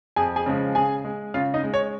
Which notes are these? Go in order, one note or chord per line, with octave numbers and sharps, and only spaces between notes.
F2 G#4 G#5
G#4 G#5
C#3 F3 G#3
C#3 G#4 G#5
G#3
C#3 F4 F5
D#4 D#5
G#3
C#5